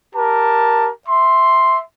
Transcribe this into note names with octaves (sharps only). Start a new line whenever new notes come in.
G4 A#4 A5
E5 C6